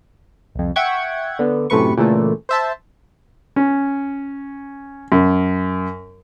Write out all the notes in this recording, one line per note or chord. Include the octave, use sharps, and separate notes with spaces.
C2 F2
E5 F#5 G5 C#6 G#6
D3 B3
F#2 A2 C3 A3 B4 C#6
A#2 C#3 E3 A3
C5 E5 A5
C#4
F#2